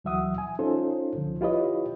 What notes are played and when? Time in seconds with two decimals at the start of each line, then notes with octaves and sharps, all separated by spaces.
0.04 D2 E3 F#3 E5 F#5 D#6
0.38 G#5
0.59 C#4 D#4 F4 A4 C5
1.15 C2 D3 F3
1.41 E4 F4 G4 B4 C#5 D#5